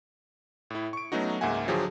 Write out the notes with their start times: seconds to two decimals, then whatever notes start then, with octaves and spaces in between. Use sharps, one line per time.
0.70 A2 E4
0.93 C#6 D7
1.12 F#3 A3 B3 C#4 D#4 F#4
1.41 C#2 G#2 A#3 E5 F#5 G#5
1.67 D3 F3 F#3 G4 G#4